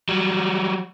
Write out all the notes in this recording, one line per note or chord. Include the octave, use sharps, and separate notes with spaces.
F#3 G3